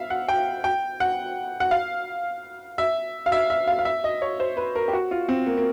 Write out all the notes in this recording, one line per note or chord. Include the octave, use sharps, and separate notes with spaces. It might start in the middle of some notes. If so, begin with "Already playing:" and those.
Already playing: E5 F5
F#5
G5
G5
F#5
F#5
F5
E5
F5
E5
E5
F5
F5
E5
D#5
C#5
C5
B4
A#4
G4
F#4
F4
C4
A#3
A#3